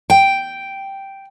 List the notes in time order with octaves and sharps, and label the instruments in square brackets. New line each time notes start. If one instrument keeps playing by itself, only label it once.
[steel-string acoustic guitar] G5